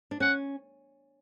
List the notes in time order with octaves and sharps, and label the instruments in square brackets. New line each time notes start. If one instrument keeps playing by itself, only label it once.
[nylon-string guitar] D4
[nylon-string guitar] C#4 [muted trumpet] F#5